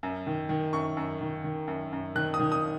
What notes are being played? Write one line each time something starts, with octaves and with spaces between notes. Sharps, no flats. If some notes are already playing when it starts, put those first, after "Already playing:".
F#2
D#3
D#3
F#2 C#6
F#2
D#3
D#3
F#2
F#2
D#3 F#6
D#6
D#3
D#6